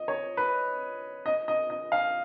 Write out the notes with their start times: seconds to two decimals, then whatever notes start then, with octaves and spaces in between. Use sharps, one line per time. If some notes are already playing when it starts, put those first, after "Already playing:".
Already playing: D#5
0.08 C#5
0.37 B4
1.26 D#5
1.48 D#5
1.70 D#5
1.92 F5